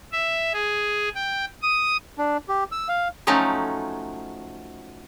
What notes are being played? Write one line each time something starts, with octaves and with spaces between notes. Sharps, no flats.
E5
G#4
G5
D#6
D4
G4
E6
F5
F3 F#3 A3 C#4 D#4